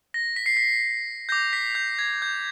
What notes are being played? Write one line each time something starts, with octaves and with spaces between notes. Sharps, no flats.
A#6
B6
C7
B6
D6 G6 A#6
B6
G6
G#6
G6